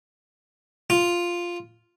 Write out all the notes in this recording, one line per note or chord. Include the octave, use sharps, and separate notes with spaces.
F4